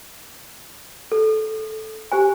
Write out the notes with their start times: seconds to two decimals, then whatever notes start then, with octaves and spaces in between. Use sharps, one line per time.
1.12 A4
2.12 G4 C5 G#5